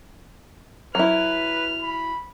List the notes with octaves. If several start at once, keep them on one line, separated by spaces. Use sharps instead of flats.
F#3 E4 B4 F6
B5